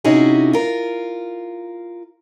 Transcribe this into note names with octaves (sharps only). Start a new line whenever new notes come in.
C3 C#4 D#4 E4 F#4 G#4
F4 A#4